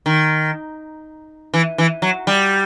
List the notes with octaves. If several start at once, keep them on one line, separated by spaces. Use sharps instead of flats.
D#3
E3
E3
F#3
G3